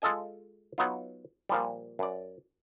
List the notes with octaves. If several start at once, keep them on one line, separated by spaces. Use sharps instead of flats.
G#3 F4 A4 D#5 G#5
F#3 B3 D#4 F4
A#2 F3 G3
F#2 D5